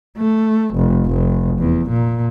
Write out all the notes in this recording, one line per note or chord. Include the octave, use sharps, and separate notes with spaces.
A3
F1
F1
E2
A#2